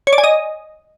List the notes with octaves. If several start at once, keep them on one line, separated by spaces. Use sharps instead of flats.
C#5
D5
G#5
D#5